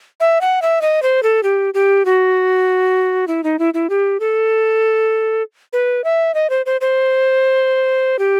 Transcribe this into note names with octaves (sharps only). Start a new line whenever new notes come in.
E5
F#5
E5
D#5
C5
A4
G4
G4
F#4
E4
D#4
E4
E4
G4
A4
B4
E5
D#5
C5
C5
C5
G4